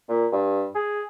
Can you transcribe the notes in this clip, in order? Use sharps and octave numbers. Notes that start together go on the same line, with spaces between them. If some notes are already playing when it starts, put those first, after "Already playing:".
A#2
G2
G#4